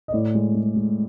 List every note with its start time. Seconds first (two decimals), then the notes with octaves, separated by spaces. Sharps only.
0.08 D#5
0.12 A2 D5
0.35 G#3
0.55 G#3
0.76 G#3